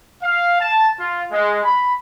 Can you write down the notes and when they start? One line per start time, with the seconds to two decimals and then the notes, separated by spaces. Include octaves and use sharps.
0.22 F5
0.60 A5
0.99 F4
1.31 G#3
1.64 B5